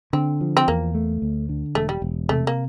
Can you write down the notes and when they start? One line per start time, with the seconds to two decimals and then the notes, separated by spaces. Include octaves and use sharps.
0.13 D3 C4
0.41 F3
0.57 C4
0.68 E2 A#3
0.95 A3
1.22 D2
1.49 D3
1.75 E1 A3
1.89 G3
2.02 E1
2.29 C3 A3
2.47 A#3